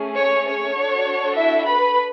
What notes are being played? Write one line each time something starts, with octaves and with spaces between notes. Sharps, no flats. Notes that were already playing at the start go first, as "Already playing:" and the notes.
Already playing: A3 C#4 G#4
C#5
C#5
D4 F#4 A4
E4 E5
B4 B5